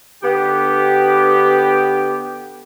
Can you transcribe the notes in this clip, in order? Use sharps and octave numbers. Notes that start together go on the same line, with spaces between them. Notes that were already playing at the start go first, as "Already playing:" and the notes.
D3 B3 G4